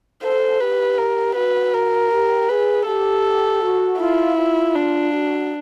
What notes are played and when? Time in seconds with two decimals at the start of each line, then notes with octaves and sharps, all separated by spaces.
0.23 A4 C5
0.61 G4 B4
0.98 A#4
1.36 F#4 B4
1.74 A#4
2.12 G4
2.49 G#4 B4
2.86 G4 A4
3.62 F#4
3.99 E4 F4
4.37 F4
4.75 D4
5.12 F#4